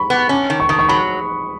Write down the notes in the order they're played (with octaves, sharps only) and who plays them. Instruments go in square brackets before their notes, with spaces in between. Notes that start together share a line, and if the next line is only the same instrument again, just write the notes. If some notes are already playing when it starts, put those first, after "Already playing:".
Already playing: [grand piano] B5 C#6
[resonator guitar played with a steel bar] B3
C#4
D#3
[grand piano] C#6
[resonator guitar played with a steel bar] D#3 [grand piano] D#6
[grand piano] C#6
[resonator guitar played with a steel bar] F#3 [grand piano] B5